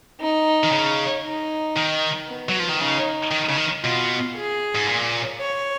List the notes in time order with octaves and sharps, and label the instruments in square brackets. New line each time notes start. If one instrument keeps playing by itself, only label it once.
[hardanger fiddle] D#4
[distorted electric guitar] D#3
C#3
[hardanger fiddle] D#4
[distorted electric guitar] D#3
[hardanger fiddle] B3
[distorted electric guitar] F#3
F3
D#3
[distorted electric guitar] C#3 [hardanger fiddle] D#4
[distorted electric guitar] D#3
C#3
D#3
[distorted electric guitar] B2 [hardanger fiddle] F4
[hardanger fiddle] G#4
[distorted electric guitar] G#2
A#2
[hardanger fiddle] C#5